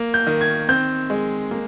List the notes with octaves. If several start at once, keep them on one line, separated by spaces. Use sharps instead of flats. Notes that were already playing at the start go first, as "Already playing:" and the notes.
Already playing: A#3
G6
D#3
G#6
C4 G6
G#3
A#3